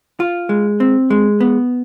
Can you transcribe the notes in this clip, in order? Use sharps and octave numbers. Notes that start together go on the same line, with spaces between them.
F4
G#3
C4
G#3
B3